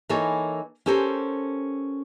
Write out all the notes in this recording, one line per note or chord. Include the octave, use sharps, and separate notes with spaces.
E3 A#3 D#4 A4 C#5
C#4 G4 A4 A#4 C5